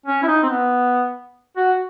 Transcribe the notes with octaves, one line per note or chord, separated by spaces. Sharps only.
C#4
E4
D#4
C4
B3
F#4